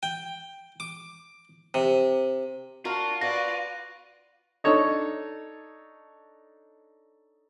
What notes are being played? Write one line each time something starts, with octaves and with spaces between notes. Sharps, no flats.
G5
D6
C3
D4 F4 F#4 A#4
F#4 B4 D5 A#6
D4 D#4 A4 C#5 D#5